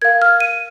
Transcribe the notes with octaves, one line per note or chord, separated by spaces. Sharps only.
A#4 F5 G#6
F6
D#7